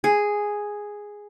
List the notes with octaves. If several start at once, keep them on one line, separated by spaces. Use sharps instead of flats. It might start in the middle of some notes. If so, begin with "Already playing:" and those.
G#4